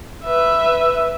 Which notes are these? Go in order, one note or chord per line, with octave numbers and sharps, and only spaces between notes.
B4 E5